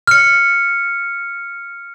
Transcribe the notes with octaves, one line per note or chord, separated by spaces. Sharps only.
F6 C#7